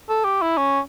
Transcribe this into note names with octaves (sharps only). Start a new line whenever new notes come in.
A4
G4
E4
C#4